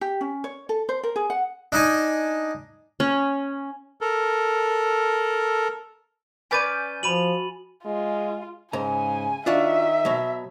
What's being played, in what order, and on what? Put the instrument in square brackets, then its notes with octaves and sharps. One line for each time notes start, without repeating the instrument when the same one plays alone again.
[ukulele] G4
C#4
C#5
A4
C5
A#4
G#4
F#5
[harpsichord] D4 D#4 G#5
[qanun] C#4
[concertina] A4 A#4
[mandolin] C#4 B4 D5 [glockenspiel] G#5 A6 D#7 [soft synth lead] G6
[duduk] F3 [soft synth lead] F#4 [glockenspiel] B5 D#7 F#7
[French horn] G#3 [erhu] F4
[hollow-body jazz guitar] G#2 A#5 [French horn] C#3 [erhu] G#5
[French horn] D#3 [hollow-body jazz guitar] D4 F4 F#4 [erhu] E5
[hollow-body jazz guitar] B2 F#3